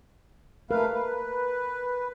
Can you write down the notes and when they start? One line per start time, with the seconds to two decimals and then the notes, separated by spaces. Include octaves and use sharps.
0.71 A3 A#4 B4 F5
0.94 B4